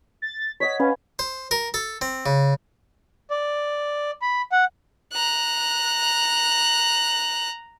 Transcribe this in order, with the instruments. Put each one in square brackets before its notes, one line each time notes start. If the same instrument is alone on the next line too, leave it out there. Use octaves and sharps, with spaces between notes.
[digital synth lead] A6
[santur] C#5 D#5 F#5 [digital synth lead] B6
[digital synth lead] C#4 [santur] B4 F5 G#5
[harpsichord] C5
A#4
A4
C4
C#3
[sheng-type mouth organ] D5
B5
F#5
[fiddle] A#5 F#6